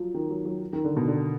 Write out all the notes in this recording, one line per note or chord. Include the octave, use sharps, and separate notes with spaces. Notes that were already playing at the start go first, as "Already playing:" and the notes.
Already playing: F3 F#3
D#3
F#3
F#3
D#3
D3
B2
D3